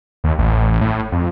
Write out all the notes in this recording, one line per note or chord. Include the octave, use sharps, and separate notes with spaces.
D#2
A1
A2
F2